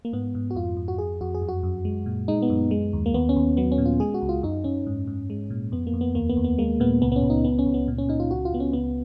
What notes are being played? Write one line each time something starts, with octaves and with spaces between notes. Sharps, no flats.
A#3
G#2 B3
G#2
F#4
F2 F4
F2
F#4
F2 G#4
F2 F#4
G#4
F#2
F#4
F#2
G#3
A#2
G#3 D#4
B3
F#2
G#3
D#2
A#3
D#2 B3
C#4
D#2
F#3 B3
C#4
A#2
F4
G#3 G#4
F#4
C#2
F4
F#2 D#4
F#2 C#4
G#2
G#2
G#3
A#2
F2 B3
A#3
F2
B3
D#2 A#3
B3
D#2
B3
G#3 A#3
A#2 B3
C#2 B3
B3
C#4
C#2
D#4
C#2 B3
C#4
C#2
B3
A#2
C#4
A#2 D#4
F4
C#2 F#4
F4
C#2 B3
C#4
C#2 B3